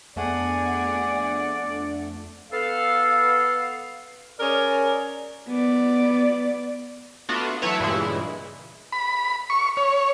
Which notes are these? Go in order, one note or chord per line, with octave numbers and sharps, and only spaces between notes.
F2 A3 B3 D4 G#4 D5 F#5
B3 A4 F5
C#4 G#4 A#4 C#5 D5
B3 D5
A3 B3 D4 F4 F#4
E3 F#3 A3 E4 B4 C#5
G2 A#2 C#3 E3 G#3 E4
B5
C#6
C#5